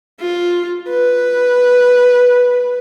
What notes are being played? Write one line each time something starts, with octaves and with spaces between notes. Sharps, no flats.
F4
B4